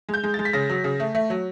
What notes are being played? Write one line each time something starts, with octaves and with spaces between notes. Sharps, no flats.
G#3
G6
G#3
A6
G#3
B6
C#3 A#6
F#3
C#3
A3
A3
F#3